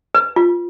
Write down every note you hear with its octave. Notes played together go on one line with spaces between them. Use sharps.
B4
F4